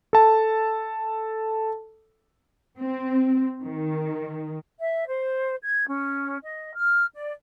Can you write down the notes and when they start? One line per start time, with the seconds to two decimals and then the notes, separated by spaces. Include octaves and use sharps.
0.13 A4 A5
2.79 C4
3.63 D#3
4.80 E5
5.06 C5
5.63 G#6
5.87 C#4
6.43 D#5
6.75 F6
7.13 D5